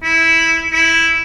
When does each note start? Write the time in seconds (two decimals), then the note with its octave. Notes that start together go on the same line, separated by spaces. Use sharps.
0.03 E4
0.73 E4